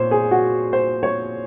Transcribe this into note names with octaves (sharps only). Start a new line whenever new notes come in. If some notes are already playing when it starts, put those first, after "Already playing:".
Already playing: A#2 C5 C#5
G#4
F#4
C5
C#5